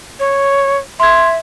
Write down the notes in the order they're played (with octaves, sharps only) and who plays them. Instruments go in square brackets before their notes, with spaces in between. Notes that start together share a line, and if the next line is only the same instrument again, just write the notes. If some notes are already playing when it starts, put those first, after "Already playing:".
[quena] C#5
[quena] E5 [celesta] C6 G#6